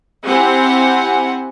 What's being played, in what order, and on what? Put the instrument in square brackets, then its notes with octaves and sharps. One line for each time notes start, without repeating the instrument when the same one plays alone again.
[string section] C4 E4 G4 F#5 G#5